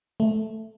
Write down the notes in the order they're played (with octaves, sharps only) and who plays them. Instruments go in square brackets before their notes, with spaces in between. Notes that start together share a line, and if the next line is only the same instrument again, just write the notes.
[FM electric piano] A3